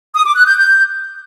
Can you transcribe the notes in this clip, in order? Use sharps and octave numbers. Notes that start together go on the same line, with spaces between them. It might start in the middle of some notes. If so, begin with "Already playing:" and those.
D#6
D6
F#6
G6
G6